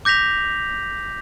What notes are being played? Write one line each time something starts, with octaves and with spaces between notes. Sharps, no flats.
D6 G6 A#6 B6 F7